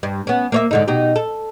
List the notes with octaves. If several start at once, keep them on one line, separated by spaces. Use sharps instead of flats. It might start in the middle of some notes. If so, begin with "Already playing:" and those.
G2
B3 C#4
A#3 C#5 E5
G#2 D3 D#4
B2 D#4 G4
A4